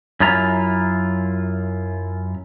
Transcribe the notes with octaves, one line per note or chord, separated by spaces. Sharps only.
F#2 E4 F4 A#5